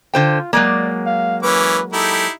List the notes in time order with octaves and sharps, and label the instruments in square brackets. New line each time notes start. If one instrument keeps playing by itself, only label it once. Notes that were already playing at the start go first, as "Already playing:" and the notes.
[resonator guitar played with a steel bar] D3 C5 G5 [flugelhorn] F4
[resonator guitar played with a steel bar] F#3 G#3 A#3 [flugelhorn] D5
[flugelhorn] F5
[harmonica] E3 C#4 D6 [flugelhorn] B4
[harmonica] D#4 E4 G4 [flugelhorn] A4